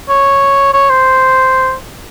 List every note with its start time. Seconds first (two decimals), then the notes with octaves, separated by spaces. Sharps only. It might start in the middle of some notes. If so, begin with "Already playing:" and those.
0.09 C#5
0.74 C#5
0.90 C5